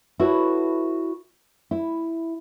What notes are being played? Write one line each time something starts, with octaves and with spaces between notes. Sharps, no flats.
E4 F#4 A4 B4 C#5
E4